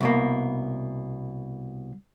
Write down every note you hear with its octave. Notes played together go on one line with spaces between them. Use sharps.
C2 B2 A#3